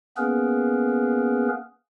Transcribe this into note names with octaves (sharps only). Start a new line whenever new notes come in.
A#3 B3 C#4 G#4 A#4 B4